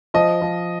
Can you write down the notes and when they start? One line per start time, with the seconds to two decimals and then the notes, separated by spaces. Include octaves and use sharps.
0.14 F3 D#5
0.42 F3